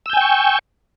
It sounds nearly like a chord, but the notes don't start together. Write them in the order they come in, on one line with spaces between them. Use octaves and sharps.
E6 G6 G#5 G5 C#6